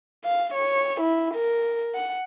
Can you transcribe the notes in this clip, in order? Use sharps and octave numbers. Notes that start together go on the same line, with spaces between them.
F5
C#5
E4
A#4
F#5